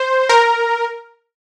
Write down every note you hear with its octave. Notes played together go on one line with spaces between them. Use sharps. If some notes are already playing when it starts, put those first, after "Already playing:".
Already playing: C5
A#4